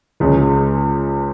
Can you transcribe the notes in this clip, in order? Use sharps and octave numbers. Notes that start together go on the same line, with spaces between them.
C#2 C#3 G#3